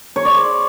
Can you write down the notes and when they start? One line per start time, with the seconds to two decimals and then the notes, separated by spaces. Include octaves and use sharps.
0.16 C#5
0.25 D5
0.34 C6